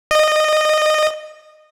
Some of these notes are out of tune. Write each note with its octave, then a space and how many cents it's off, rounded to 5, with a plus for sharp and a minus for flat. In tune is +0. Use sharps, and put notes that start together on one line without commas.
D#5 -20